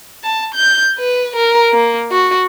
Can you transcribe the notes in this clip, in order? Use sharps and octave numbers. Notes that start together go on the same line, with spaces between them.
A5
G6
B4
A#4
A#3
F#4